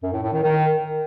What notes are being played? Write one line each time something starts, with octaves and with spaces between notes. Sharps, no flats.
F#2
A2
A2
D#3
D#3